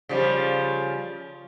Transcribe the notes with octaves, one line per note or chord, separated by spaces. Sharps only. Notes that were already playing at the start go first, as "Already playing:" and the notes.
C#3 F3 G3